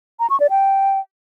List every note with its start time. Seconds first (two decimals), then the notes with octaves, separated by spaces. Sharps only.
0.20 A#5
0.30 C#6
0.40 D5
0.50 G5